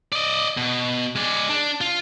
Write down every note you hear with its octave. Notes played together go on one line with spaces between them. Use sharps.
D5 D#5
B2
G#3 D5
D4
F4